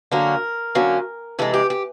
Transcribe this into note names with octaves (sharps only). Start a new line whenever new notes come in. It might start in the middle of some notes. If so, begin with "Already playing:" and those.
D3 F#3 A#3 C#4 A#4
D3 F#3 A#3 C#4
C3 E3 G#3 A4
G4
G4